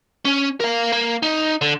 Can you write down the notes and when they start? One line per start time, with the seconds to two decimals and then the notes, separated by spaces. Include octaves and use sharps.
0.25 C#4
0.60 A#4 F5
0.92 A#3
1.23 D#4
1.62 D3